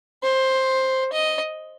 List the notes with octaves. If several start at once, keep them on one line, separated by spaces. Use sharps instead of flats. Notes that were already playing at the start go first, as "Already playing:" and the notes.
C5
D#5